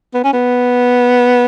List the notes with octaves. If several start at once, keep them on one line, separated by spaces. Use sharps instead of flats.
B3
C#4
B3